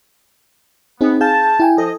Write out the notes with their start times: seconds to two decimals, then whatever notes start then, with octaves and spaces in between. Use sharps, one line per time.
1.01 B3 C4 D#4 G#4
1.21 G#4 F5 A5 G6
1.60 E4 G5 G#5
1.78 F3 A4 D#5